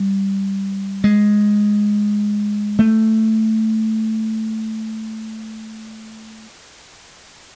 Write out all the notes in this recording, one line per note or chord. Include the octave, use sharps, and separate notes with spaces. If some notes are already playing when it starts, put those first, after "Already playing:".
Already playing: G3
G#3
A3